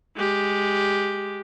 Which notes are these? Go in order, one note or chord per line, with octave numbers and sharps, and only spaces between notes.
G#3 G4